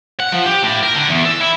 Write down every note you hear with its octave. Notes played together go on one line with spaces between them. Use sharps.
F#5
F3
G4
A2
A#4
D3
E2
A4
E4